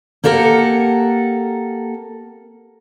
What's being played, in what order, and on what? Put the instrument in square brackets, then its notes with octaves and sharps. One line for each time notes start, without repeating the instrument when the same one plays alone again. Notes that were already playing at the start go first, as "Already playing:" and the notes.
[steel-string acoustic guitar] A#3 G4 A4 A#4 F#5